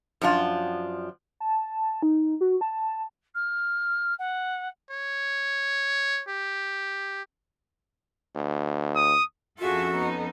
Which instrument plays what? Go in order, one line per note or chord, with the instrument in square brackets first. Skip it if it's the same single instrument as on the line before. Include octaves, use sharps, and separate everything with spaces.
[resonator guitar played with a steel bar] F#2 F3 D4 F4
[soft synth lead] A5
D#4
F#4
A5
[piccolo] F6
F#5
[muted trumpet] C#5
G4
[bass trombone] D2
[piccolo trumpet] D#6
[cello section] F2 C#4 A4 [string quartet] F4 G#4 E5 [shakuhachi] F#4
[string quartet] B3 D#4